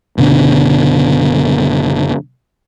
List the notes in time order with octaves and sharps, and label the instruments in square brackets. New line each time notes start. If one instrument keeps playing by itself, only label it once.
[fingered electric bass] F#1 B2 D3